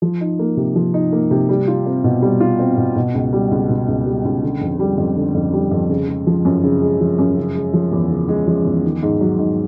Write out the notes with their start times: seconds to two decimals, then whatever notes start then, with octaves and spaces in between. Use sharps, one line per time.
0.02 F3
0.21 D#4
0.39 A#3
0.57 C3
0.76 F3
0.94 D#4
1.12 A#3
1.31 C3
1.49 G3
1.68 F4
1.86 C4
2.04 B2
2.22 G3
2.40 F4
2.59 C4
2.78 B2
2.96 B2
3.14 C#2
3.33 G3
3.51 C#2
3.69 B2
3.88 C#2
4.06 G3
4.25 C#2
4.43 D3
4.61 F2
4.80 G3
4.98 F2
5.16 D3
5.35 F2
5.53 G3
5.71 F2
5.90 C#3
6.08 G#3
6.27 F3
6.45 F#2
6.63 C#3
6.82 G#3
7.00 F3
7.19 F#2
7.37 C#3
7.56 G#3
7.73 F3
7.92 E2
8.11 C#3
8.29 G#3
8.47 F3
8.65 E2
8.84 D#3
9.03 G#2
9.21 F#3
9.39 G#2